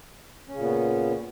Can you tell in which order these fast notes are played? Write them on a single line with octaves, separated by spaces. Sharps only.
C#4 C#3 A#2 B3